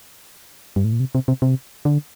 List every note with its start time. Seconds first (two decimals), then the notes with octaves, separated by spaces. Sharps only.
0.76 G2
0.85 A2
0.92 A#2
1.00 C3
1.15 C3
1.28 C3
1.42 C3
1.85 D3